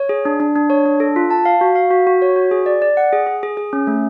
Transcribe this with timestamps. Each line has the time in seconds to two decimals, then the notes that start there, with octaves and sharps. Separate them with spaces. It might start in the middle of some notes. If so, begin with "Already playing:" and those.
Already playing: C#5
0.09 G#4
0.25 D4
0.40 D4
0.56 D4
0.70 C#5
0.85 D4
1.00 A4
1.16 F4
1.30 A5
1.45 F5
1.61 F#4
1.75 F5
1.91 F#4
2.07 F#4
2.22 C#5
2.36 F#4
2.51 G#4
2.66 D5
2.82 D5
2.97 F#5
3.13 G#4
3.27 G#4
3.43 G#4
3.57 G#4
3.73 C#4
3.87 A3